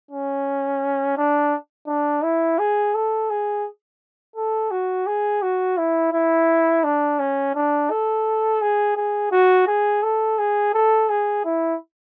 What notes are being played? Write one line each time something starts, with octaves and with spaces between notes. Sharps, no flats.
C#4
D4
D4
E4
G#4
A4
G#4
A4
F#4
G#4
F#4
E4
E4
D4
C#4
D4
A4
G#4
G#4
F#4
G#4
A4
G#4
A4
G#4
E4